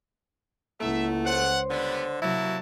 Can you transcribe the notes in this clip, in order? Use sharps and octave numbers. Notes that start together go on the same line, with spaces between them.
C#2 A3 A#3 E4 E5 F#5
C5 C#5 F#5 C6
D3 G3 B3
C3 F#3 A#3 E4 F#4 A5